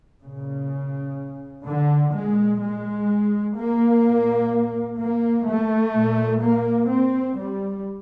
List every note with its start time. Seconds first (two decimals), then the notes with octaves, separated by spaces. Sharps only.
0.23 A#2 C#3
1.66 D3
2.13 A#2 G#3
2.61 G#3
3.56 A#3
4.03 A#2
4.98 A#3
5.46 A3
5.93 A#2
6.41 A#3
6.88 C4
7.36 G3